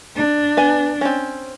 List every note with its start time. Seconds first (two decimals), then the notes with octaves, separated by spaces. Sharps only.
0.16 D4
0.57 B3 G#5
1.01 C4 C#4